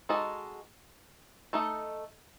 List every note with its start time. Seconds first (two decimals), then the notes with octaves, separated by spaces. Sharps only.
0.09 G#3 D#4 F#4 A4 D#5
1.53 A3 D#4 A4 D#5